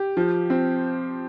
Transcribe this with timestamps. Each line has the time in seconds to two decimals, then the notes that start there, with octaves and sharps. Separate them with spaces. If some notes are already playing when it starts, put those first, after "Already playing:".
Already playing: G4
0.17 F3
0.50 C4